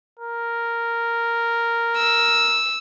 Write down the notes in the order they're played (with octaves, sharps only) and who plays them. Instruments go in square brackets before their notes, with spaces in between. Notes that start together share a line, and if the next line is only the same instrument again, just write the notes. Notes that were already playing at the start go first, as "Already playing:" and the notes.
[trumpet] A#4
[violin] E6